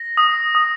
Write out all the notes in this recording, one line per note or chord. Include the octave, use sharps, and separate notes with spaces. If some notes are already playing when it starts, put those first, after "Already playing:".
Already playing: A#6
D#6
D#6